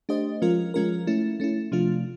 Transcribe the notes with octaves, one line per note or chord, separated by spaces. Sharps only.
A3 D4 G4 C5 D#5
F3 G#3 C#4 F4 A#4
F3 G#3 C#4 F4 A#4
A3 C#4 E4
A3 C#4 E4
C3 F3 A3 D4 F4